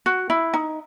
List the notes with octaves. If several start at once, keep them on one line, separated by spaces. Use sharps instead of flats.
F#4
E4
D#4